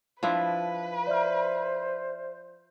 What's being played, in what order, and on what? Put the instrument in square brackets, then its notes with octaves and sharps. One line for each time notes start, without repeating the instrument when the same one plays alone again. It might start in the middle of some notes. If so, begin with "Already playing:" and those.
[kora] F3 D4 E4 [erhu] B4
[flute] C5 [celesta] D5 E5 F6